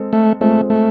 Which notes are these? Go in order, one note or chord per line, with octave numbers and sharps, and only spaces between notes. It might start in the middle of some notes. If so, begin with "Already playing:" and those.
Already playing: G#3 C4 A4
A3
G#3 A3 C4 F4 A4
A3